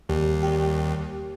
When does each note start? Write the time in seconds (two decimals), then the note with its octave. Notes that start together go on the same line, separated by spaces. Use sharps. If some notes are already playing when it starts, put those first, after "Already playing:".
0.09 D#2 G3
0.43 G3 G4